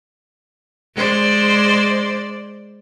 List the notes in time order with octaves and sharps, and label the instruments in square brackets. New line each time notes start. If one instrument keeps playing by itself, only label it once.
[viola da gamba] G#3 C5 D5